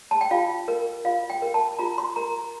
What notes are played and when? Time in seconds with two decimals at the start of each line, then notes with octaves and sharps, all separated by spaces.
0.11 A5
0.21 G5
0.31 F4 F5
0.68 A#4
1.05 F4 F5
1.30 G5
1.42 A#4
1.54 A5
1.79 F4 A#5
1.98 C6
2.16 A#4 A#5